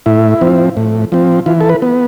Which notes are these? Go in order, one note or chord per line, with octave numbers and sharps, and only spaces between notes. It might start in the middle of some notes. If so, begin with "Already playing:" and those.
A2 E4
F3 C4
A2
F3 C4
E3 F4
A4
B4
B3